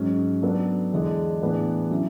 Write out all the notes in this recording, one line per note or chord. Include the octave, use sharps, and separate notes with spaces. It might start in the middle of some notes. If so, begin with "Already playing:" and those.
Already playing: G#2 F#3 C#4
F#3 B3 D4 A4
E2 D3 G#3 D4 G#4
A2 E3 B3 D4 G#4
F#3 C#4 E4